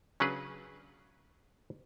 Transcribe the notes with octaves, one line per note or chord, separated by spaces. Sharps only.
C#3 F#3 C#4 D4 G#4 B4